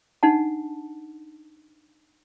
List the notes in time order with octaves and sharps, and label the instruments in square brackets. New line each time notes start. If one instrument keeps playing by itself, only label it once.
[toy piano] D4 D#4 F#5 A5